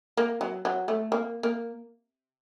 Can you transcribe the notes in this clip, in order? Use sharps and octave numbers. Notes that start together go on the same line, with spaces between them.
A#3
F#3
F#3
A3
A#3
A#3